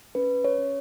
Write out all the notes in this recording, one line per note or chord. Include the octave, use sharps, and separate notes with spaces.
C#4 B4
C#5
C#4